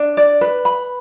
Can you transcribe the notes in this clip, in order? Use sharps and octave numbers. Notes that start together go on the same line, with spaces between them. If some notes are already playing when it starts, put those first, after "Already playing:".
Already playing: D4
D5
B4
B5